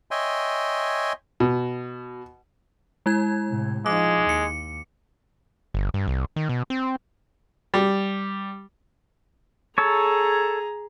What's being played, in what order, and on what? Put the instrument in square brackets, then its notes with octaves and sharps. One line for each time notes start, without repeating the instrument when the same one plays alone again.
[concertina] C#5 D#5 E5 G5 G#5 C6
[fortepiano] B2
[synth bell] G#3 E4 G#6
[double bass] A2 C3
[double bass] F3 D#4 [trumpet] G#3 [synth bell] D6
[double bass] D#2 [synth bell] C#7
[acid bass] G1
G2
C2
D#3
B2
C4
[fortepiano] G3
[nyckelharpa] G#4 A#5 [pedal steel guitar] A4 C#5